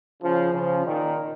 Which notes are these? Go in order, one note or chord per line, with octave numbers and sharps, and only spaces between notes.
C#3 F3
C#3 F3
A#2 D#3